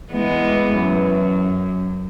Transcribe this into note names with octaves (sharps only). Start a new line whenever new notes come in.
E3 G#3 B3
F#2